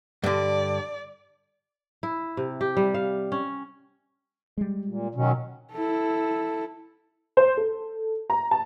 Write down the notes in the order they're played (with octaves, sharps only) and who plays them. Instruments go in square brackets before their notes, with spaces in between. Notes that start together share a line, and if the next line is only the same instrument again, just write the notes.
[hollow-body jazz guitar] G2 D3 [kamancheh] D5
[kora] E4
C3
G4
G3
F5
C#4
[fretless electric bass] G3 G#3
[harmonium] A#2
[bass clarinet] B2 [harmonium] D#3 F#3 C#4
[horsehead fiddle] E4 A4
[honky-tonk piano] C5
A4
A#5
A5